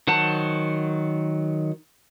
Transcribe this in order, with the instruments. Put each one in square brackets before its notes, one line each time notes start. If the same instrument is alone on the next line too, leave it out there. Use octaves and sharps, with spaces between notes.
[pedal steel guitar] D#3 F#3 C5 F#5 A5